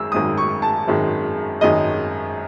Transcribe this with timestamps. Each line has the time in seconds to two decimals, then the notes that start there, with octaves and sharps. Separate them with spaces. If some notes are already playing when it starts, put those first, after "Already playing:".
Already playing: G#1 F#2 D#3 G#3 E6
0.12 G#1 F#2 D#3 G#3 D#6
0.38 C#6
0.62 A5
0.88 G#1 F#2 D#3 G#3
1.61 G#1 F#2 D#3 G#3 D#5